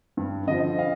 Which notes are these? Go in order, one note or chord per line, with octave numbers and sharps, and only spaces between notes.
G2
D3 F3 D#5
F5